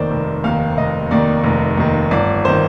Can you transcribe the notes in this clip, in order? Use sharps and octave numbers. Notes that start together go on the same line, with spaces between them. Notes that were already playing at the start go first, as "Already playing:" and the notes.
Already playing: F1 D#2 D#3 C5 D5
F1
D#2 D#3 F5
F1 D#5
D#2 D#3 D5
F1
D#2 D#3
G1 D5
D#3 C5